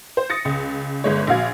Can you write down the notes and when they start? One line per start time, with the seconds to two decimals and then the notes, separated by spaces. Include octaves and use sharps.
0.17 C5
0.30 D#6 A6 A#6 C#7
0.45 C#2
1.04 G1 G#3 C#5
1.27 A#1 F#4 F5 G#6